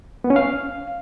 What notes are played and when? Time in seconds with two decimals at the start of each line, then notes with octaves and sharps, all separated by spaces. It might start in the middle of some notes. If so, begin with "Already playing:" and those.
0.24 B3
0.30 C#4
0.36 F5